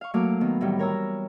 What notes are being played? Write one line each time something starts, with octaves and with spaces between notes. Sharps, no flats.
F5 C#6
F#3 A3 A#3 F5 D6
D#3 B3
A2 D#3 E3 G3
A#4 C#5 A#5 E6